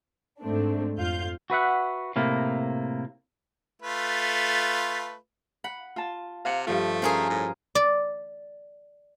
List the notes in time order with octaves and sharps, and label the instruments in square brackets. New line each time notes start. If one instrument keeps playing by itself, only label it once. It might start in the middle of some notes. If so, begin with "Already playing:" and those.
[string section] G#2 A3 C4 D4
F2 F4 F5 G6
[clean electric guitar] F#4 B4 E5 F#5
A2 C3 A#3 E4
[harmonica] A3 F4 B4
[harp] F#5 [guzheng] B5
[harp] F4 A5
[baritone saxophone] C3 [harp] F5 F#5
[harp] G2 F3 F4 [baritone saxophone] A3
[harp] C#4 [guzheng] G#4 A#4 C5
[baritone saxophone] A2
[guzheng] D5